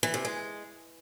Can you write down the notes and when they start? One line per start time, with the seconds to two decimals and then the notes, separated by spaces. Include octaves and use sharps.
0.03 E3
0.14 C3
0.25 G#3